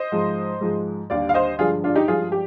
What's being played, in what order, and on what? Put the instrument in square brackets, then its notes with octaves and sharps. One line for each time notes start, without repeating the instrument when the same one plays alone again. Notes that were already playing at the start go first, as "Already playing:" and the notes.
Already playing: [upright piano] C5 D#5
G#2 F3 G#3
G#2 F3 G#3
D#2 D3 G3 D5 F5
F5
C5 D#5
G2 D3 F3 G#3 F4 G#4
D4 F4
D#4 G4
G2 F3 G#3 F4 G#4
G4